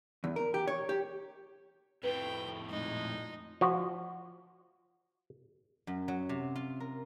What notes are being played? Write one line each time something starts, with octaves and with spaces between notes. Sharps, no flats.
E2
A#4
G4
C#5
G4
F2 A2 B4 G5
A#2 G#3 A3 D#4
F3 F#4
F#2
F#3
C3
F4
A#4